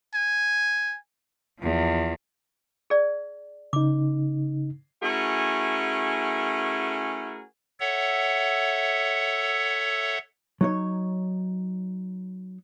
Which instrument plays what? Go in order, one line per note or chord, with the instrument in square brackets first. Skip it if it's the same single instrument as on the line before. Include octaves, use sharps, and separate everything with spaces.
[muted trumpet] G#5
[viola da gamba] E2 F3
[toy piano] G#4 D5
[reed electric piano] C#3 D#4 [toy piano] D6
[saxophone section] A3 C#4 E4 F#4 G#4 A#4
[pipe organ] A4 C#5 E5 F#5
[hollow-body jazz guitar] F#3 D#4 C#5